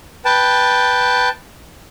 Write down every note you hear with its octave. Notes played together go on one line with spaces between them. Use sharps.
B4 G5 A5